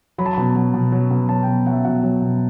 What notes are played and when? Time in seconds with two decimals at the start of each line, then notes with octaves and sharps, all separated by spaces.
0.18 F#3 B5
0.26 A5
0.33 B2 B5
0.56 F#3
0.74 B2
0.92 F#3
1.11 B2
1.29 F#3 A5
1.43 B2 G5
1.66 F#3 F#5
1.71 E5
1.85 B2 F#5
2.03 F#3
2.21 B2